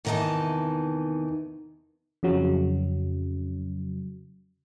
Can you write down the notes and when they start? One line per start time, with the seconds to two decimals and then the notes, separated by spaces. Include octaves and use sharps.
0.05 E2 C3 D#3 E3 D#4 A5
2.23 F2 C#3 F#3